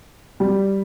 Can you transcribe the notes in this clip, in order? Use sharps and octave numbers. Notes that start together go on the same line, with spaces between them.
G3